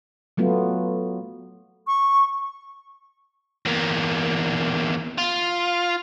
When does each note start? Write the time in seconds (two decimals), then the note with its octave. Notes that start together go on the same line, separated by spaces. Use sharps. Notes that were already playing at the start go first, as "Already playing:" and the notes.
0.37 F#3 A3 B3 F4
1.87 C#6
3.65 E2 A#3
5.18 F4